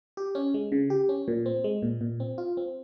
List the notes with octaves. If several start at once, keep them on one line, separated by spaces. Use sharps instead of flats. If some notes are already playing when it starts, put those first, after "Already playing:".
G4
C#4
G#3
C#3
G4
C#4
A#2
C4
G#3
A#2
A#2
C4
F4
C4